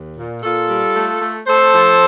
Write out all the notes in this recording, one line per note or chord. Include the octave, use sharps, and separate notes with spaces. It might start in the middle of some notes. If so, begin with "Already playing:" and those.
Already playing: D#2
A#2
A#2 F4 A4
G3
A3
A3
A3 A4 C5
F3